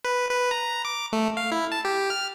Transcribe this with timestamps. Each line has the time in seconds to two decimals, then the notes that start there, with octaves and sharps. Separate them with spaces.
0.05 B4
0.30 B4
0.51 A#5
0.85 D6
1.13 A3
1.37 F5
1.52 E4
1.72 A5
1.85 G4
2.10 F6